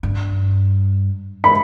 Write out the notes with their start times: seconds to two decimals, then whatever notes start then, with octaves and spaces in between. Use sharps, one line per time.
0.03 G2
1.44 B5